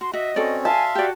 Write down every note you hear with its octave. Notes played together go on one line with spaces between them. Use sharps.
F#4 C6
F#4 D#5 E5
C4 C#4 F#4 A4 D5
E5 F5 G#5 A5 C6
F#4 G4 D5